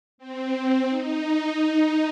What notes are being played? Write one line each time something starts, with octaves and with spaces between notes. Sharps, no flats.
C4
C4
D#4
D#4